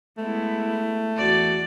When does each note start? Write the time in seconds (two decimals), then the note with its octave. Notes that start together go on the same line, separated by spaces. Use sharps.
0.18 G#3 A3 B3 E4
1.17 E2 F#4 D5